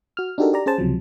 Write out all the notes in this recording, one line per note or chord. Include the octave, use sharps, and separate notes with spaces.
F#4 F6
D4 D#4 F#4 G4 A4 A#4
G4 D5 A#5
C#4 G#4 C5 A5
C#2 C3 F3 F#3